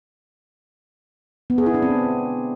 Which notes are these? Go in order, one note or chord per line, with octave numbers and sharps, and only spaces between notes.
B3
G#4
E4
D4
C4